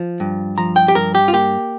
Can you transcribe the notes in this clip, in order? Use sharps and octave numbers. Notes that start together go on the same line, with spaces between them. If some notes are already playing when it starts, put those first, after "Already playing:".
Already playing: F3
G2
F3 A#5
G5
G4
G2 A#4
G4
F4
A#3 G4